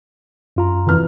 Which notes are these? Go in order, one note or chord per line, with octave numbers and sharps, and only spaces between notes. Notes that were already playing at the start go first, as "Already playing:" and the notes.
F#2 F4 A#5
F1 E2 F6